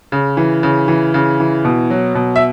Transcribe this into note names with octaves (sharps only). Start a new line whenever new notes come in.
C#3
E3
C#3
E3
C#3
E3
B2
F#3
B2
E5